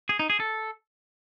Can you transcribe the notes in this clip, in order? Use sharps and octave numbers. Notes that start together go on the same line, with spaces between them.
G#4
D#4
G#4
A4